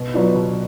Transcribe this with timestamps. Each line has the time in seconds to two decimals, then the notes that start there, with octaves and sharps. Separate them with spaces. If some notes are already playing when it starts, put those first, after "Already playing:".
Already playing: B2
0.14 F#3 B3 D4 F4
0.35 B2